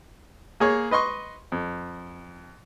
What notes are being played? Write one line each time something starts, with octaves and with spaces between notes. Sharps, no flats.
A#3 G#4 C#5
B4 D#5 C6 C#6
F2